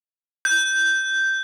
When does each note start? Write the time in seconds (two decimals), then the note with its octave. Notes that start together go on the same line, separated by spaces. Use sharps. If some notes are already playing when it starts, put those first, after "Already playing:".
0.45 G6